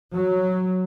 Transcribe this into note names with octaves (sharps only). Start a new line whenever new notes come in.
F#3